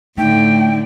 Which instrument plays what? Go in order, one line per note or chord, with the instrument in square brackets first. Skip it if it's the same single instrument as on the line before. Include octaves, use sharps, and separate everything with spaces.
[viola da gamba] A2 D3 [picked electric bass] A3 [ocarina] D#4 [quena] G5